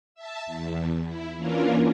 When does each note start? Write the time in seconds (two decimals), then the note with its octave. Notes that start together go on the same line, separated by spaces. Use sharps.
0.15 E5 A5
0.46 E2
1.05 E4
1.37 E3 A#3 C#4 D4 F4 A#4